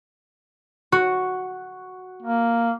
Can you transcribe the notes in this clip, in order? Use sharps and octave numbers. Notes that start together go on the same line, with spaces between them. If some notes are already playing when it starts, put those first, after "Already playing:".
F#4
A#3